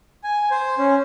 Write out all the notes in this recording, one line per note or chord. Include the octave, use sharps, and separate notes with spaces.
G#5
C5
C#4